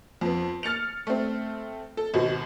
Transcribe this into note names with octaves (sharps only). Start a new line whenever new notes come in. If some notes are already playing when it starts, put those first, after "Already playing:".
F2 B3
F6 A6 C#7 F7
A3 C4
A4
G#1 B2 F#4